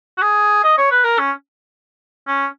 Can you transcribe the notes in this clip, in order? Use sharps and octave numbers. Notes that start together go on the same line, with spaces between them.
F#4
G#4
D#5
C#5
B4
A#4
C#4
C#4